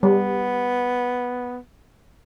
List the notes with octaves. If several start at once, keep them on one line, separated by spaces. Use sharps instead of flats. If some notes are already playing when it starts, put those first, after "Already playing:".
G3 B3